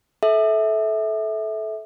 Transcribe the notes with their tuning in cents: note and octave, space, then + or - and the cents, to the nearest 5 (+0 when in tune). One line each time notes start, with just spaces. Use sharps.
A4 -25 E5 -15